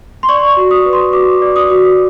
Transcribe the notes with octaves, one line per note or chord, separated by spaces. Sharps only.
C6
D5 C#6
F#4
D#6
B4
C6
F#4 D6
D5
D#6
F#4